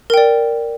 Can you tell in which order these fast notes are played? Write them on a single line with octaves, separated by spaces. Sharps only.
A#4 G5 D5